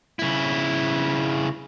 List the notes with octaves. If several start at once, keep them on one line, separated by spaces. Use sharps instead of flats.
C#3 E4